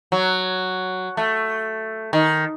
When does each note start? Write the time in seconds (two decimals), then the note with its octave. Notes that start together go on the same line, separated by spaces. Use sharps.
0.12 F#3
1.17 A3
2.13 D#3